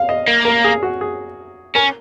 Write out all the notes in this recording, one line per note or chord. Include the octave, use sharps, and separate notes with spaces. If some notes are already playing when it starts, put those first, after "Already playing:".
Already playing: F5
D#5
A#3
A#4
G#4
F#4
G#4
C#4 A#4